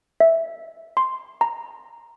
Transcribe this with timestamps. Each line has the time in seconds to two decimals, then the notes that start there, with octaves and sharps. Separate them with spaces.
0.20 E5
0.97 C6
1.41 A#5